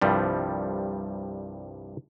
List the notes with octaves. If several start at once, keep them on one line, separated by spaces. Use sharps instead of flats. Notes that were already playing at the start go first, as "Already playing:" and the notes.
C2 G2 F3 G3